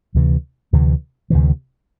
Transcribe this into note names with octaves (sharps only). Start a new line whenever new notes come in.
D2 C3 E3
D2 C3 E3
D2 C3 E3